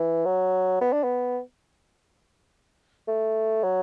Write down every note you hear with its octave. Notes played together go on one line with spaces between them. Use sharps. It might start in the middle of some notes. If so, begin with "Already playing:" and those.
Already playing: E3
F#3
B3
D4
B3
A3
F#3